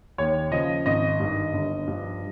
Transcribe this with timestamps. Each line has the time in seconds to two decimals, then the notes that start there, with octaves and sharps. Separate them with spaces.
0.18 D#2 C#5
0.52 C#3 F3 D#5
0.86 G#1 D#5
1.20 G2 D#3
1.53 G1
1.88 G2 F3